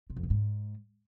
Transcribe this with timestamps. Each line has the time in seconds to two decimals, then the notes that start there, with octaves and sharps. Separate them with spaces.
0.10 C3
0.16 F2
0.23 B2
0.30 G#2